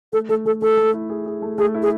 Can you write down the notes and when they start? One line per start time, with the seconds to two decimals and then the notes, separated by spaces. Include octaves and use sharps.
0.13 A3 A4
0.29 A3 A4
0.45 A3 A4
0.61 A3 A4
0.77 A3
0.93 E4
1.10 G#4
1.26 G#4
1.42 A3
1.58 A3 G#4
1.74 E4
1.82 G#4